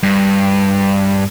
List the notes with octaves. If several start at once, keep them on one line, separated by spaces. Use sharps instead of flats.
G2